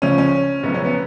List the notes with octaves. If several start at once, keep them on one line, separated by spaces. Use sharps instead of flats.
C#2 C#3 F3 C#4
C#4
F#1 F#2 F3 B3
C#4
B3